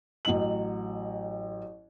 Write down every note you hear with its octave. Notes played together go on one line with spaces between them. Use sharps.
A1 F#3 D#5 F#7